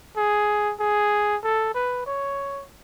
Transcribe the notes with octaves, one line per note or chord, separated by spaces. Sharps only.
G#4
G#4
A4
B4
C#5